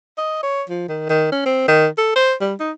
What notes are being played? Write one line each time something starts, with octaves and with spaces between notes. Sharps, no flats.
D#5
C#5
F3
D#3
D#3
C#4
C4
D#3
A4
C5
G3
D#4